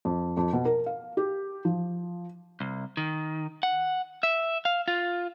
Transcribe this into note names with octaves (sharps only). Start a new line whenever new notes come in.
F2
F2
B2
A#4
F5
G4
F3
C2
D#3
F#5
E5
F5
F4